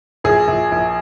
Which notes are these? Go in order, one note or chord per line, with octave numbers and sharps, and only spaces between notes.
A#1 G#4
A#1
A#1